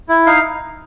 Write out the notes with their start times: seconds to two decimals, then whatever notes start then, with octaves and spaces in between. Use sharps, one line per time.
0.09 E4
0.26 D#4 F5